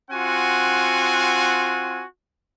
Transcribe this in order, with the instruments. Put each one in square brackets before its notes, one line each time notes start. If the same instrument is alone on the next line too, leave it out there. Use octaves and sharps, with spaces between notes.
[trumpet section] C4 F4 F#4 F#5 G#5